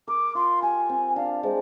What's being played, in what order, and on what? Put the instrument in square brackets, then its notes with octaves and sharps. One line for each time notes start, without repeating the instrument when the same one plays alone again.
[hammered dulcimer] A#4 [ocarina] D6
[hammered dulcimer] F4 [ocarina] C6
[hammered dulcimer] G4 [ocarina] G#5
[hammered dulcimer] C4
[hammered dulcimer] D4 [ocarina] F5
[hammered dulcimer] G#3 [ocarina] C5